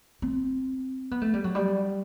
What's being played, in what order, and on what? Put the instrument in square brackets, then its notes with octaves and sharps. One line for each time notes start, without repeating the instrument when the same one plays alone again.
[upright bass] C4
B3
A3
G3
F#3
G3